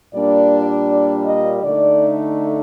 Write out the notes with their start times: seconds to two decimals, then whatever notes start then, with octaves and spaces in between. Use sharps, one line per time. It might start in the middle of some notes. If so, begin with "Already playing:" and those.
0.13 A#2 G3 A#3 D4 D5
0.88 D5
1.26 D#5
1.62 D3 A3 D#4 D5